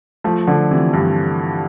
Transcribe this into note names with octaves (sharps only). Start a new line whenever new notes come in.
F3 A3
D3 F3
C3 E3
G2